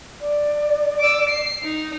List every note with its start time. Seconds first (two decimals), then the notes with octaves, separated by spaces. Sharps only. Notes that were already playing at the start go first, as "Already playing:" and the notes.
0.20 D5
0.99 D6 E6
1.30 C7
1.63 D#4